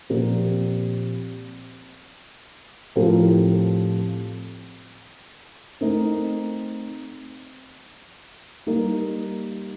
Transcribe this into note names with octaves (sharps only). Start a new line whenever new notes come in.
A#2 F3 C4 G4 A#4
A2 F3 C4 G4 A#4
A3 C4 D#4 A#4
G3 A#3 D#4 A#4